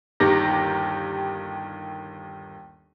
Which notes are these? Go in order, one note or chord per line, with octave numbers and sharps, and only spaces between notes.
G1 D#2 D#3 G4 A#5 A#6